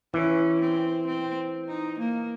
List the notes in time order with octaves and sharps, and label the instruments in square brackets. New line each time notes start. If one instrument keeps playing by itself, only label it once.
[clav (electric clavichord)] E3 [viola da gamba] C#4
[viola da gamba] C4
C4
D#4
A#3